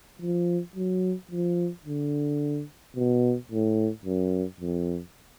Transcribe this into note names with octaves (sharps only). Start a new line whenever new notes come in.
F3
F#3
F3
D3
B2
A2
F#2
F2